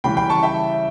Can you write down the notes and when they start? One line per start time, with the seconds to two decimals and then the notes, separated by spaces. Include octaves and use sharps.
0.04 C#3 E3 G3 C#4 G5 B5
0.17 G5 B5
0.30 A5 C#6
0.43 E5 G5